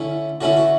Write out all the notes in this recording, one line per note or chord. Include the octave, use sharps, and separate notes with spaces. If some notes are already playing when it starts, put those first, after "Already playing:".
Already playing: D3 A3 C#4 E4
D3 A3 C#4 E4 F#4
F#4